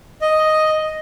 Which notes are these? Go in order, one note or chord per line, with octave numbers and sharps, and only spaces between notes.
D#5